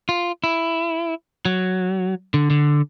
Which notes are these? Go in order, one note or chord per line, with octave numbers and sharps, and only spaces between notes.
F4
E4
F#3
D3
D3